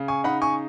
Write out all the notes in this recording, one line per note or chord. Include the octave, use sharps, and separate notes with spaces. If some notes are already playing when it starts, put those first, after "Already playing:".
Already playing: C#3
G#5 C#6
D#4 F#5 B5
G#5 C#6